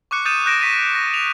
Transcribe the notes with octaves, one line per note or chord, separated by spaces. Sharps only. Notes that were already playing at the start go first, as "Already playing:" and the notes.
C#6 D6 F#6 C#7
D#6 G6 A6 D#7 E7
F#6 G6 A#6 D7 E7
C#6 B6 D#7
A#6
F7